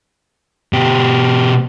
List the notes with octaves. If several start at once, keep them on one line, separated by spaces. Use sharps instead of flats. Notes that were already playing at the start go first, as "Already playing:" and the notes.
B2 G4